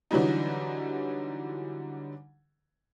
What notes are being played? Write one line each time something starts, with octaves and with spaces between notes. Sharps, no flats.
D3 E3 F#3 G3 D#4